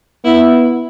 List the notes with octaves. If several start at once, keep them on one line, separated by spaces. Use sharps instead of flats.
B3 E4